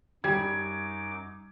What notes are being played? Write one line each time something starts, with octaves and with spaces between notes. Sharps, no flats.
F#2 G3 D#4 D6 G#6